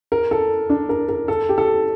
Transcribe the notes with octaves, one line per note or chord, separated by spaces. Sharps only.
A#4
A4
D4
A#4
A#4
A4
G4
A4